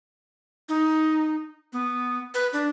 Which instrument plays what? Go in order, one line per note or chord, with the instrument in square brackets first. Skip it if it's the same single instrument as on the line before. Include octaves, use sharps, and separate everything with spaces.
[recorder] D#4
B3
B4
D4